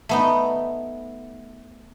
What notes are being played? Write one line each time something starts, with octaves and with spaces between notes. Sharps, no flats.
A3 B3 D#4